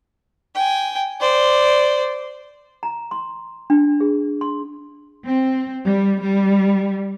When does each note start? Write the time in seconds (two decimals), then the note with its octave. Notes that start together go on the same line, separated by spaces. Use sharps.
0.55 G5 G#5
1.21 C5 D5
2.83 A#5
3.11 C6
3.70 D4
4.00 G#4
4.41 C6
5.25 C4
5.86 G3
6.23 G3